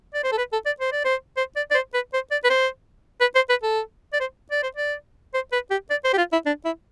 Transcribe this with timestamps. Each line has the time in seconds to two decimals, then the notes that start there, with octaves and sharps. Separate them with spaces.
0.14 D5
0.24 C5
0.32 A4
0.38 B4
0.53 A4
0.66 D5
0.80 C5
0.92 D5
1.05 C5
1.37 C5
1.56 D5
1.71 D5
1.74 C5
1.94 B4
2.13 C5
2.31 D5
2.44 B4
2.50 C5
3.20 B4
3.35 C5
3.49 B4
3.63 A4
4.13 D5
4.20 C5
4.51 D5
4.63 C5
4.76 D5
5.34 C5
5.52 B4
5.70 G4
5.90 D5
6.04 C5
6.13 G4
6.17 F4
6.32 E4
6.46 D4
6.65 E4